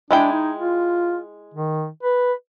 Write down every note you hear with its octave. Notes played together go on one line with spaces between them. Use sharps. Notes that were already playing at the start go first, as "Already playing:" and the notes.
G#3 D4 E4 G5
D#4
F4
D#3
B4